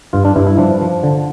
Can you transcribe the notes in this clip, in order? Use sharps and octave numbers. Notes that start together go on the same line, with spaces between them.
G2 F4
D4
G2 E4
E4
F3 D4
F3
D3